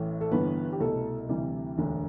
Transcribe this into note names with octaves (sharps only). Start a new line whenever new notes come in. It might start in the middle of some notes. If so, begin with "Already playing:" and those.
Already playing: A1 A2 E3
A4
G1 G2 E3 B3 B4
G4
C2 B2 A3 A4
D2 C3 E3 G3 G4
E1 D2 D3